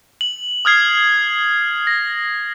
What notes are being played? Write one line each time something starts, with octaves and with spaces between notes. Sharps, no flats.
F#7
D#6 F6 G#6 C7
A#6